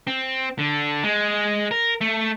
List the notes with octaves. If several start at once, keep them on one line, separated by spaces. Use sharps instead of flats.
C4
D3
G#3
A#4
A3